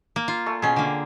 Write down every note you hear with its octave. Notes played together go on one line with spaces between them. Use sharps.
A#3
F4
A3
B2 C#4 G#4 G5
D3 A#3